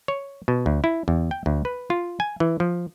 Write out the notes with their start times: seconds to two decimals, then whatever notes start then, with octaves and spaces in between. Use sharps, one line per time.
0.08 C#5
0.48 B2
0.66 D2
0.84 E4
1.08 E2
1.31 G5
1.46 D2
1.65 B4
1.90 F4
2.20 G#5
2.40 E3
2.60 F3